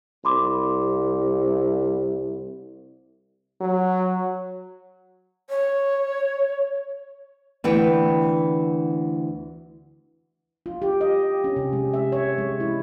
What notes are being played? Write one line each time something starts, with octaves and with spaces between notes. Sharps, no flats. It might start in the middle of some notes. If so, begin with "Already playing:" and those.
C2 B5 C6 D6
F#3
C#5
D2 E3 B3 G5
F4
G4
D#5
C#4
C3
G#3
E5
C#5
G#3
E4